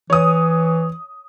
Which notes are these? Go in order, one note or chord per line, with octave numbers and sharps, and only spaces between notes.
E3 C#5 D#6